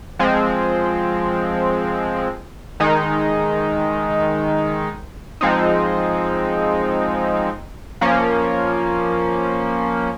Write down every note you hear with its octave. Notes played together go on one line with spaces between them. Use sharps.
F3 G#3 C4
D#3 G#3 D#4
F3 G#3 C4 D#4
F3 A#3 C#4